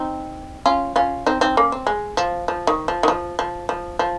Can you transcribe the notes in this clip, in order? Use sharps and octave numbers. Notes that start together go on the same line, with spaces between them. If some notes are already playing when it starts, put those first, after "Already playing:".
Already playing: C4 D#4
C#4 F4
C#4 F4
C4 D#4
C4 D#4
A#3 C#4
C4
G#3
F3
F3
D#3
F3
D#3
F3
F3
F3
F3